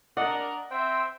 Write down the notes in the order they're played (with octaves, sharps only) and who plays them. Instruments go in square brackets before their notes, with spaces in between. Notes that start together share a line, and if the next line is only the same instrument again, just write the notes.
[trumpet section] D4 A#4 [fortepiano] D5 D#5 [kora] F#5
[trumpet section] C4 E5 [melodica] C5 G5